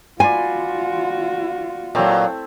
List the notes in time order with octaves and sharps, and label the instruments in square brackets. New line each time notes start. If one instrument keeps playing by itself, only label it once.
[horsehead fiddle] F4 F#4 [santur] D5 B5 C6 [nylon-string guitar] G#5
[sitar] A#2 F#3 [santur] A3 C4 E4